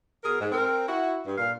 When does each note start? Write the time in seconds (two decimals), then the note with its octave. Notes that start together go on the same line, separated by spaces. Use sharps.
0.23 B2 G#4 A#4
0.39 G#2
0.52 C4 A#4
0.87 E4 F#4
1.25 G2
1.38 A#2 F5